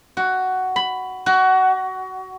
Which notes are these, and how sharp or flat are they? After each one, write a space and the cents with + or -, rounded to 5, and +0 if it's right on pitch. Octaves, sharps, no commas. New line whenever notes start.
F#4 +10
B5 +10
F#4 +20